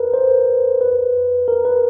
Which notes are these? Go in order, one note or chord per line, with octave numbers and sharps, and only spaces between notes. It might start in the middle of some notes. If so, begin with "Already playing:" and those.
Already playing: A#4 B4
C5
B4
A#4
B4